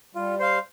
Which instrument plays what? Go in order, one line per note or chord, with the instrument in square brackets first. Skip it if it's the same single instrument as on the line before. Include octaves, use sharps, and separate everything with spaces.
[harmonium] G3 [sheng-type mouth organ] F4
[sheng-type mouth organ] C5 F5